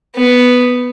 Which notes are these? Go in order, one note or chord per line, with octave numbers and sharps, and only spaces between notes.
B3